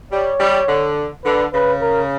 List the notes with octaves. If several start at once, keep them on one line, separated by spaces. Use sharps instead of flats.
G3 C#5
G3
D3
D3 B4
C#3 B4
A#4